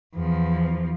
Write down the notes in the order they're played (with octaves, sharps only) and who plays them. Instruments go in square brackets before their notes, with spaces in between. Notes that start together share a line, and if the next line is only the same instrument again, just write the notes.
[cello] E2 F3